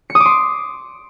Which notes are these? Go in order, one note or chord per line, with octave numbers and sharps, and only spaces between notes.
C#7
D#6
D6
C6